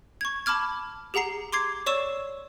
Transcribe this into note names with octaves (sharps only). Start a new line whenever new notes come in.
C#6 G#6
A5 B5 D6 F6 G#6
G4 G#4 F#5 A#5 C7
C6 D6 G#6 C7
C#5 D5 C#6 E6 E7